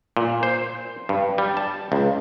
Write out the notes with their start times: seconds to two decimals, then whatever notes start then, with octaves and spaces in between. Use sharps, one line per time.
0.17 A#2
0.43 C5
1.09 G2
1.38 G3
1.57 A5
1.92 C#2